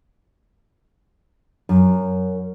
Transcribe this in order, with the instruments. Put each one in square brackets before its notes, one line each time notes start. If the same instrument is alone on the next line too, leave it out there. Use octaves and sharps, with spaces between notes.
[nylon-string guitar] F#2